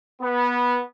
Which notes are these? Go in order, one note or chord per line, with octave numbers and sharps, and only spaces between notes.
B3